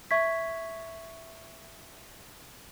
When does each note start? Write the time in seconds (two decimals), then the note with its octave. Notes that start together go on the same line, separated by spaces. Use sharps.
0.11 E5 C#6 G#6 B6